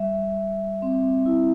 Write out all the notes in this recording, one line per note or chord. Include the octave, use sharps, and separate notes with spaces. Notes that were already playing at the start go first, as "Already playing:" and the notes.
Already playing: G3 E5
G3
C4
E4